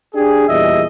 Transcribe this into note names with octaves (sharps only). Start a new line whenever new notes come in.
D4 G4 G#4
E2 A#2 G3 D#5 E5